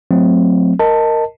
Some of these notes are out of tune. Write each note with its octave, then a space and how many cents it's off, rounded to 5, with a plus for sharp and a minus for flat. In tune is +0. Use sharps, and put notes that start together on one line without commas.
F#3 -30 A3 +0 C4 -10
A#4 -5 D#5 +0 A5 +10